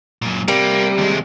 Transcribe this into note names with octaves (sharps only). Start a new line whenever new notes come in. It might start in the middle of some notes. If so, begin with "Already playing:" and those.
F#2 A#2
C3 G3 A#3
D#2 G#3